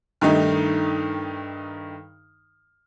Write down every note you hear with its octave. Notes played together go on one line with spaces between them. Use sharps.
G2 D#3 A3 D#4